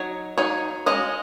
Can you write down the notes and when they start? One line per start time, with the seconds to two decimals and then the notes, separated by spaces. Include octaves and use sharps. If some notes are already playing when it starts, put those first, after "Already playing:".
Already playing: F#3 D#4 C#5
0.38 F#3 D#4 C#5
0.86 G#3 C#4 D#5